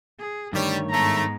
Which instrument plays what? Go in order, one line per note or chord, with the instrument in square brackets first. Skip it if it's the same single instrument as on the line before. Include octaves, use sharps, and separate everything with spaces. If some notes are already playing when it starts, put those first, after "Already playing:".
[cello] G#4
[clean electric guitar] G2 D#3 C#5 [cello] D3 A3 [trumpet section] G3
[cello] G#2 B3 [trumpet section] A3 [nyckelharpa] A#5